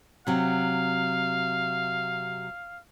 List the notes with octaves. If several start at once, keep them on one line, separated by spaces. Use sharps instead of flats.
C3 F#3 F5